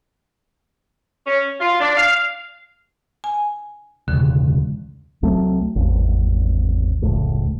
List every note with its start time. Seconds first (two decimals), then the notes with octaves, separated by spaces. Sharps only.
1.26 C#4
1.61 F4
1.80 D4
1.97 F5
3.24 G#5
4.08 E1 C#2 D3
5.23 C2 F#3 A3 C4
5.76 G#1 E2
7.02 F1 C#2 A2